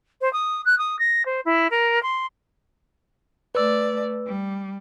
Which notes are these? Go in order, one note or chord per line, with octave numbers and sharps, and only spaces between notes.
C5
D#6
F#6
D#6
A#6
C5
E4
A#4
C6
A3 B4 D5 E6
G3